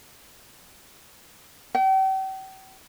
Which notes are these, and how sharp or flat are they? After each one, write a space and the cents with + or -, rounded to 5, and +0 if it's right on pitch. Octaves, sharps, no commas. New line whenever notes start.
G5 -40